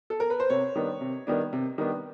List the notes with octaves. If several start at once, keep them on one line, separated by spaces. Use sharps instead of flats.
A4
A#4
B4
C5
C3 C#5
D#3 G3 B3 D4
C3
D#3 G3 B3 D4
C3
D#3 G3 B3 D4